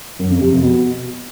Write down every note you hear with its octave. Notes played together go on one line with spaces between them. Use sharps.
F#2
F2
C3
F2
B2